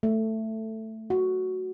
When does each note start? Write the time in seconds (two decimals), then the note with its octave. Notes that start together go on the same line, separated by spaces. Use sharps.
0.03 A3
1.10 F#4